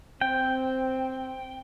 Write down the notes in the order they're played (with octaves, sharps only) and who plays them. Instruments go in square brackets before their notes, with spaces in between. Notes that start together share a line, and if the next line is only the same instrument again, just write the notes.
[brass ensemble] C4 [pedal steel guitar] G5